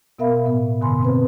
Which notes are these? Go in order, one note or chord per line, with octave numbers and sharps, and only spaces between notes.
B2 B3 A#4 E5 F5 B5
A2 B3
G2 B2 D3 G#5 B5 C6
C4 B4 C5